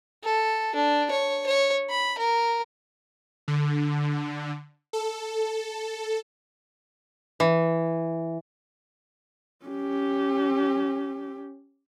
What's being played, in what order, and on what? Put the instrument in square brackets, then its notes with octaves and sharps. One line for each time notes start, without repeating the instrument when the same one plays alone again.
[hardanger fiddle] A4
D4
C#5
C#5
B5
A#4
[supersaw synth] D3
A4
[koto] E3
[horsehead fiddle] C#4 G4